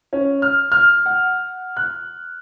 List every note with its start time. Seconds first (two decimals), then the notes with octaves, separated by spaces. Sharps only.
0.13 C#4
0.42 F6
0.72 F6
1.06 F#5
1.77 F#6